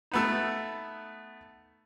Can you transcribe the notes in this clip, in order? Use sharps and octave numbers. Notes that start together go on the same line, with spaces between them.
A3 B3 D#4